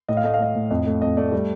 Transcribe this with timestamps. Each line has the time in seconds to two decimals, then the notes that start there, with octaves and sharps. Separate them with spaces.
0.09 A2 D#5
0.17 F5
0.24 A3 D#5
0.34 F5
0.39 A3 D#5
0.55 A2
0.70 F2 D#5
0.87 A3
1.02 F2 D#5
1.17 A3 D5
1.32 G3